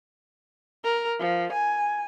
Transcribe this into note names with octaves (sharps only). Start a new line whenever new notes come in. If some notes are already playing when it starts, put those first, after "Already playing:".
A#4
F3
G#5